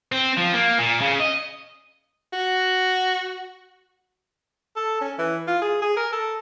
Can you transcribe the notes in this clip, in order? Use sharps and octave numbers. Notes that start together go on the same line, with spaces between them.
C4
F3
A#3
A#2
C#3
D#5
F#4
A4
C#4
E3
F4
G#4
G#4
A#4
A4